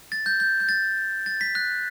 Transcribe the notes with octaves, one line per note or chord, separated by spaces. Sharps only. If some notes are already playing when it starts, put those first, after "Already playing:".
A6
G6
G6
G6
A6
A6
B6
F#6